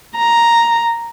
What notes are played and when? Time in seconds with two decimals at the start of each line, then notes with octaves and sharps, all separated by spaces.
0.17 A#5